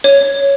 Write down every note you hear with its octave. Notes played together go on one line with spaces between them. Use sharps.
C#5